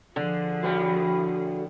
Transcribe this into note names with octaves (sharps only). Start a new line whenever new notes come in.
D3 F3 G#4
A2 G3 B3 F#4